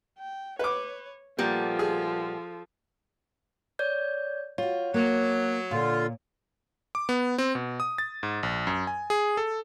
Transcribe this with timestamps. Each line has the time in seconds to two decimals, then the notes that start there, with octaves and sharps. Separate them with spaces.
0.18 G5
0.59 B4 C#5 D6
1.38 A#2 F3 G3 A#3 B3 A4
1.79 G#4
3.79 C#5 D5 G6
4.58 F4 F#4 C#5
4.94 F#3 A#3
5.71 A#2 D3 F4
6.95 D6
7.09 B3
7.38 C4
7.55 B2
7.80 D#6
7.98 A6
8.23 G#2
8.43 A#1
8.67 F#2
8.87 G#5
9.10 G#4
9.37 A4